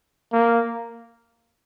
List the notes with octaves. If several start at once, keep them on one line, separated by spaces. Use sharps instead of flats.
A#3